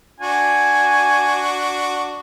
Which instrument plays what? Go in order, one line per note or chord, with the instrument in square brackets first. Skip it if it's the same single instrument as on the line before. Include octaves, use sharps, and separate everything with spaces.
[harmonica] D4 F#4 [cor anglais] G#5